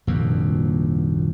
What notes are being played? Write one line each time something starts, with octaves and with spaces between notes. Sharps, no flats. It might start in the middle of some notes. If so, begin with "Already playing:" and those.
D#1 A#1 F#2 C3